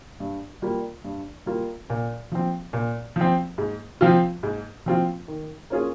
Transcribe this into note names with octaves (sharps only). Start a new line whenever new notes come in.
G2
G3 A#3 F4
G2
G3 A#3 F4
A#2
F3 C4
A#2
F3
C4
G#2
F3 C4 F4
G#2
F3 C4 F4
D#3
A#3 C#4 F4 G#4